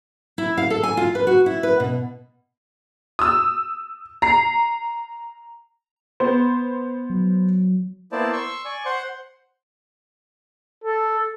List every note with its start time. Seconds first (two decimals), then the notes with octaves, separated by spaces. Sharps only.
0.38 E4
0.57 F5
0.70 A4
0.83 G#5
0.97 F4
1.15 B4
1.27 F#4
1.46 E4
1.63 B4
1.80 B2
3.19 D#6 E6
4.22 A#5 C7
6.20 B3 C5
7.10 F#3
8.12 A#3 B3 E4 C5 D5 A5
8.33 C6 C#6 E6
8.65 D5 G#5 C#6
8.86 C5 F#5 C6
10.84 A4